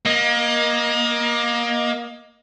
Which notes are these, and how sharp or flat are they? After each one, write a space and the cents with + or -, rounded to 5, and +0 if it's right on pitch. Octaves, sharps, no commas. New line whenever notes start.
A#3 +25 D#5 +0